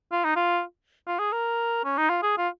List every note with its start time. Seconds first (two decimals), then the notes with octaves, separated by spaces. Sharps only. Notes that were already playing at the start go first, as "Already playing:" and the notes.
0.12 F4
0.25 D#4
0.36 F4
1.07 F4
1.19 G#4
1.33 A#4
1.85 C#4
1.98 D#4
2.10 F4
2.22 G#4
2.38 F4